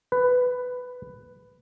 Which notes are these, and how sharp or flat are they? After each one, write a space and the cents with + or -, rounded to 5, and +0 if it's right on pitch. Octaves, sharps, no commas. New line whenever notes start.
B4 +10